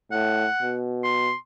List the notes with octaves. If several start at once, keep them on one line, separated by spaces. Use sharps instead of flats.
A2 F#5
B2
C6